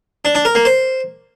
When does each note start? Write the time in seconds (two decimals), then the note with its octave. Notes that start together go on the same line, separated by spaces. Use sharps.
0.25 D4
0.35 D4
0.45 A#4
0.55 A#3
0.65 C5